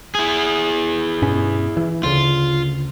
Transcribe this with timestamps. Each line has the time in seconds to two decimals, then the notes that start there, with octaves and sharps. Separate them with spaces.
0.15 E4 G#4
1.22 G2 B2 C#4
1.77 E3
2.03 D2 C#3 F4